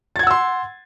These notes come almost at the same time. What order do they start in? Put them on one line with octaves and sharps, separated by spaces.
A6 G#6 F#5 E6 C6